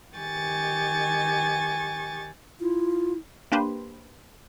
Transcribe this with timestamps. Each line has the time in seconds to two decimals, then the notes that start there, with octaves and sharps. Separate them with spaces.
0.16 D#3 G4 G#5 C#6 A6
2.61 E4 F4
3.52 A#3 D4 G4 B4 C5